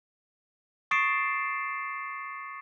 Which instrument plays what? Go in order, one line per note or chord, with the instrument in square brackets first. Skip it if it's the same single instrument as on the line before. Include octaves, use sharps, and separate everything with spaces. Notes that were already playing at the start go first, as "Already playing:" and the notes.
[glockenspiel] C#6 D#6 A6 C7 D7 E7